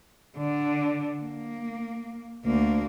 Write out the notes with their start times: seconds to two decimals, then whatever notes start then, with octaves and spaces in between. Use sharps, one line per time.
0.38 D3
1.23 A#3
2.45 D2 A#3